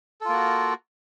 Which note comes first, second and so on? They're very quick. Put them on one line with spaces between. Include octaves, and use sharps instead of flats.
A4 F4 A#3 F#4